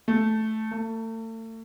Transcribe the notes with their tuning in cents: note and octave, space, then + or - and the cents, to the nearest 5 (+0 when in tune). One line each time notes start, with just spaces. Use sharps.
A3 -5
A3 +35